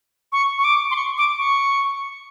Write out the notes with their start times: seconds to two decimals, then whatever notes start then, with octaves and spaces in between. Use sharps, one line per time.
0.32 C#6
0.58 C#6
0.64 D6
0.91 C6
0.96 C#6
1.18 D6
1.38 C#6